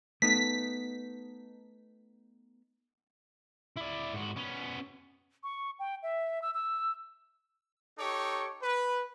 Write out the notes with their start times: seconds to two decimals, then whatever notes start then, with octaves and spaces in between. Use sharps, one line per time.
0.22 A3 B3 D#4 B6
3.77 E4 D5
4.14 G#2 F#4
4.37 B3 C#4
5.43 C#6
5.79 G5
6.03 E5
6.42 E6
6.54 E6
7.98 D#4 G4 A4 C#5 C#6 D6
8.62 B4